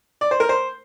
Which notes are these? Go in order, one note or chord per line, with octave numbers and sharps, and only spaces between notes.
D5
C5
A#4
C5